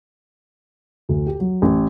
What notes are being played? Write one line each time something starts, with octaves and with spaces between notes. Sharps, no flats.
D2
G4
F#3
A1